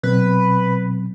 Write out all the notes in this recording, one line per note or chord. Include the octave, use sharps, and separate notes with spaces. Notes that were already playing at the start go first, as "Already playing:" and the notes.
B2 F#3 C4 B4